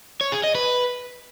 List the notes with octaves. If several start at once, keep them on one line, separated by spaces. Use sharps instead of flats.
C#5
G#4
D#5
B4